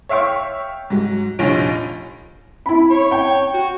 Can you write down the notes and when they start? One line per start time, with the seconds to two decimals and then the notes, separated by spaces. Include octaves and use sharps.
0.09 C#5 E5 F5 G5 C#6
0.90 G#2 F#3
1.39 F1 A#1 F4 C#5 D7
2.66 E4 B5
2.91 C#5
3.11 G5
3.54 F#4